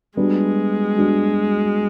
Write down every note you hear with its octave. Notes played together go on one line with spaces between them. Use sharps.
G3 G#3 B3 D4 F#4
G3 B3 D4 F#4